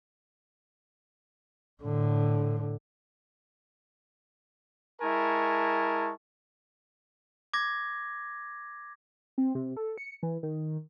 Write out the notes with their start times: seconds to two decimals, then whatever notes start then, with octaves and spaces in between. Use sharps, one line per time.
1.83 A2 D3
5.02 G#3 E4 A#4 G#5 A5 C#6
7.53 D6 G#6 A#6
9.38 C4
9.55 C3
9.76 A4
9.98 C#7
10.23 E3
10.43 D#3